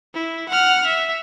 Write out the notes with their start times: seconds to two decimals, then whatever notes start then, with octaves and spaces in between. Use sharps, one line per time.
0.14 E4
0.49 F#5 F6
0.86 E5